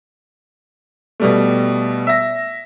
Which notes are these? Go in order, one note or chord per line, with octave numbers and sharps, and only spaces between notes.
B2 G3 A3
E5 A#6